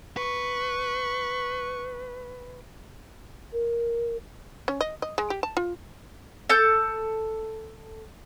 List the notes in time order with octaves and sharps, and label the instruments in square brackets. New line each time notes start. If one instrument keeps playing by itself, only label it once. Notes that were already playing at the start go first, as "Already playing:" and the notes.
[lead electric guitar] B4 [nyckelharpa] C#6
[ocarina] A#4
[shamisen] C#4
D#5
D#5
G#3
G4
A5
F4
[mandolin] A4 A5 G6